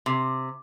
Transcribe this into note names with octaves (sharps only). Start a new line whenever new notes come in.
C3